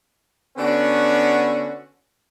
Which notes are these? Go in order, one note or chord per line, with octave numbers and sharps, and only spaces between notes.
D3 B3 C#4 D4 F#4 F#5